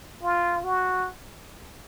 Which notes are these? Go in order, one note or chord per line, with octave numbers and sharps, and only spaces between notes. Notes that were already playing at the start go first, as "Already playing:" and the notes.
F4
F#4